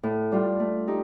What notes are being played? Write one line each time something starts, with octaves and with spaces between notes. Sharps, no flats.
A2
G3 D4 F4
A3
D#4 G4